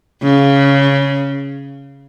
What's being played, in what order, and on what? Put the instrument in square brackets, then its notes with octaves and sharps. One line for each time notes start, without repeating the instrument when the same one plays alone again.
[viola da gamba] C#3